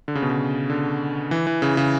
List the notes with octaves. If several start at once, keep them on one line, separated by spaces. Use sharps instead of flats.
D3
C#3
B2
C#3
D3
E3
E3
C#3
C#3